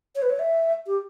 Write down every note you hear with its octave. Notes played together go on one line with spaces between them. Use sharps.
C#5
B4
C#5
E5
G4